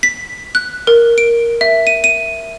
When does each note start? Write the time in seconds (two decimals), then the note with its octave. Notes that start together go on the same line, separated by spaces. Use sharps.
0.03 B6
0.55 F#6
0.87 A#4
1.18 D7
1.61 E5
1.87 D#7
2.04 D#7